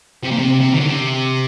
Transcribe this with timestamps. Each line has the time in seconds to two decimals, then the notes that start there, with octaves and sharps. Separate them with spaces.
0.23 C3
0.31 A#2
0.38 C3
0.61 C3
0.73 D#3
0.80 D3
0.86 C3